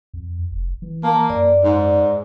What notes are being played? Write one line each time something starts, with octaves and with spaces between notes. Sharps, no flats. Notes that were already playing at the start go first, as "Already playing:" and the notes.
F2
F1
E3
A#3 A5
F#2 D5
G#2